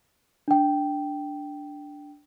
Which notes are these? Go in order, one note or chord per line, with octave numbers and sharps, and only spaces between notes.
D4 G5